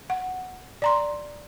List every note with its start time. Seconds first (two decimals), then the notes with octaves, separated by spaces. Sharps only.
0.10 F#5
0.82 D5 A#5 C6